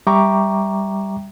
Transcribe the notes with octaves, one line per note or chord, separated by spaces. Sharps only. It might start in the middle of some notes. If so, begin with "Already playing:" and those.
G3 E5 G5 A#5 C#6 D6